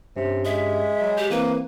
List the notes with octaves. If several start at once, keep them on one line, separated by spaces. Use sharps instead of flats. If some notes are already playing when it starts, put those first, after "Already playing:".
G2 C3 C#4 G4
G#3 E5
F#3 D#5 G#5 B5
G4 G6 B6
E3 A#3 C4 E4 B4